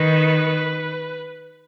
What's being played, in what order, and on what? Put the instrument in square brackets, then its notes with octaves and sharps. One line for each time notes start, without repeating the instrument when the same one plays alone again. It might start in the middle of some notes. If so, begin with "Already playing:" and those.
Already playing: [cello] D#3 [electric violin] B4